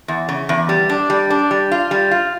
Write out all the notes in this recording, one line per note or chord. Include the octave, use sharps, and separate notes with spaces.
E2
C#3
E2
G3
D4
G3
D4
G3
F4
G3
F4